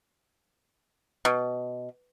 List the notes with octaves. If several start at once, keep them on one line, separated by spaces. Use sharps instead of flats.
B2